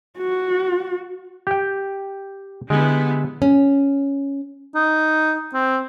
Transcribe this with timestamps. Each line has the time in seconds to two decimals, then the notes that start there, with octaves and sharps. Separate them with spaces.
0.19 F#4
1.47 G4 G5
2.70 D3 G3 G#3 B3 E4
3.42 C#4
4.75 D#4
5.54 C4